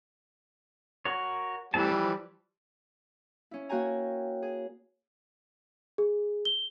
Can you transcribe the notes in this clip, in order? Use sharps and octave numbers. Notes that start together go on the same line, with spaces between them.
F#4 A#4 C#5
E3 G3 A3 C4 A5
F3
C#4 E4
A#3 F#4 C#5 G5 G#5 A#5
G#4
G#4
G7